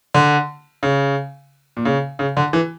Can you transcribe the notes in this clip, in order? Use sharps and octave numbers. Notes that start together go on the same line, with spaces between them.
D3
C#3
A#2
C#3
C#3
D3
E3